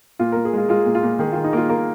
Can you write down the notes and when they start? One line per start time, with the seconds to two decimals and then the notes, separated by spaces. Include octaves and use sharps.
0.19 A#2 F4
0.32 A#2 A#4
0.45 G#4
0.53 G#3 F4
0.69 G#3 F4
0.86 A#2
0.95 F4
1.03 A#2
1.19 D#3 G#4
1.32 D#3 F4
1.44 D#4
1.53 A#3 F4
1.69 A#3 A#4